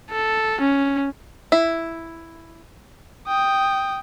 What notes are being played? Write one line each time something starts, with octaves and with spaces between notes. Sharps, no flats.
A4
C#4
E4
G5 D#6